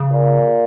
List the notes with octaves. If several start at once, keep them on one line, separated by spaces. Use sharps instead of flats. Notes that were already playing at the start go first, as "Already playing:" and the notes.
Already playing: C#3
A#2